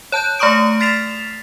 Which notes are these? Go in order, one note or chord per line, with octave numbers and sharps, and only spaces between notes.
C#5 A5 F#6 G6
A3 A#5 C#6 D#6 D7
F6 A6 B6 C7 E7 F7